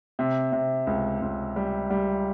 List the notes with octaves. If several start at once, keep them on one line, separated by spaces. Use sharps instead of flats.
C3
C3
C#2
C#2
G3
G3